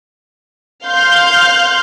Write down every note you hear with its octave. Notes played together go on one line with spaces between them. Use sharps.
F5 C6 G6